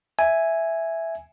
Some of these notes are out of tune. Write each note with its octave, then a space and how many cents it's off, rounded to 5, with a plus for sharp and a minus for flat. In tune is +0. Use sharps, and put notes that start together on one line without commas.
E5 +0 G#5 +0